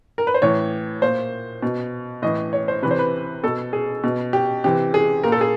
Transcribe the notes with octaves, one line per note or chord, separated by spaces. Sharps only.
A#4
B4
C5
A2 E3 C#5
A#2 C5
B2
A2 E3 D#5
C#5
C5
C3 E3 B4
C5
B4
B2 A4
G#4
B2
G4
C3 E3 G4
G#4
A#2 A#4
A4
G#4